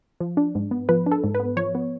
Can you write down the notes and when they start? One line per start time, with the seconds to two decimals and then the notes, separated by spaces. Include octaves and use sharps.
0.20 F3
0.37 D4
0.55 G#2
0.71 B3
0.89 F3 B4
1.06 D4
1.12 A4
1.24 G#2
1.35 B4
1.40 B3
1.57 F3 C#5
1.75 B3